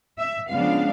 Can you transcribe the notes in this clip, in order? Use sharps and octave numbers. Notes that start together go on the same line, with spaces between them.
E5
C#3 F3 G#3 B3 D4 F5